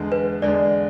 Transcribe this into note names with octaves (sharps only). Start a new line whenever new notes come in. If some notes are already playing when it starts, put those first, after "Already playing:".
Already playing: E2 D3 G#3
B4
E2 D3 G#3 D5